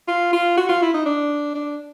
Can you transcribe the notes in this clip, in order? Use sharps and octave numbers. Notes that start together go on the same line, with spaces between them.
F4
F4
F#4
F4
E4
D#4
D4
D4